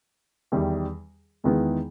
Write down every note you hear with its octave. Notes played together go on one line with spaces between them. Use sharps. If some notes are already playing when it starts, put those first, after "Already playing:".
E2 D#3 G3
E2 D#3 G#3 B3 E4